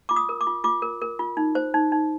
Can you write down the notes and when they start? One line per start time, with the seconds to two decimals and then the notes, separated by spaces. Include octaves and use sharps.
0.09 F4 D6
0.16 D#6
0.29 A#4
0.41 D6
0.47 F4
0.64 F4 D6
0.82 A#4
1.02 A#4
1.19 F4
1.37 D#4
1.55 C5
1.74 D#4
1.92 D#4